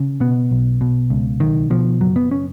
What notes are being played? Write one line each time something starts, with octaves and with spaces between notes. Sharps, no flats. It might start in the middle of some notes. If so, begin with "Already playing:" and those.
Already playing: C#3
B2 B3
B1
B2
C#2
B1 D#3
B2 F3
F#1 F#3
B3
C#4